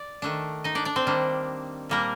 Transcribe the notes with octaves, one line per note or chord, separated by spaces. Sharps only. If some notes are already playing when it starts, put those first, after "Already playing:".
Already playing: D5
D#3 A3 D4
D#4 D#5
D4 D5
D4 D5
C4 C5
D#3 G3 A#3 D4
A#2 G3 A#3 D4 A#4